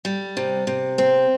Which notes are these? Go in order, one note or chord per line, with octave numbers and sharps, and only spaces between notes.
G3
C3
C3
C4